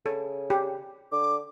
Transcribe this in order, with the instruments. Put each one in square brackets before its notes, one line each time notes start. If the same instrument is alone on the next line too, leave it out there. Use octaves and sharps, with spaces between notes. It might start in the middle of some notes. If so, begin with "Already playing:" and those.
[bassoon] C#3 [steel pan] A4
[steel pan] G4
[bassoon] D3 [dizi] D6